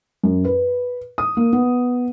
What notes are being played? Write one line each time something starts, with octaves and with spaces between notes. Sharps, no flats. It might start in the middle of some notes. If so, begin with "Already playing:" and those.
F#2
B4
D#6
A#3
B3